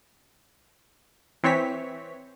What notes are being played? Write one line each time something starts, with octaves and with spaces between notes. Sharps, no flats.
E3 C4 C#5 B6